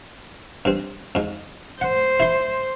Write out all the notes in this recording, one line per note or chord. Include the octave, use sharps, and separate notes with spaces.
G2 C4
F2 G#2
C5 F#5
E4 C6